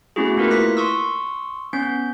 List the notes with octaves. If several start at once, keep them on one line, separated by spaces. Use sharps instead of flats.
A3 B3 C#4 E4 F#4 G#4
A3 A#3 E4 F4 A#4 B4
F#6 A#6 B6
C6 C#6 D#6 E6
B3 C#4 G6